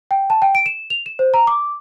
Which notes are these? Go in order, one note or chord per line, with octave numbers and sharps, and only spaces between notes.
G5
A5
G5
D7
E7
F7
E7
C5
A#5
D6